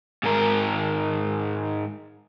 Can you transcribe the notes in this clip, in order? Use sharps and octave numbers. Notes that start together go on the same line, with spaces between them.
G#2 A#4